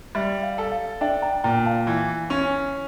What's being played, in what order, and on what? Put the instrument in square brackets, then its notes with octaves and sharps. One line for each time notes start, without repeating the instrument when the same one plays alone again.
[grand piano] G3 [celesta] E5
[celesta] F5
[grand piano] A4
[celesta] F5
[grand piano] D4 [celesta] E5 G5
[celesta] G5 A#5
[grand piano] A#2 [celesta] G5 A#5
[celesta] F5 A5
[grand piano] E3
C#4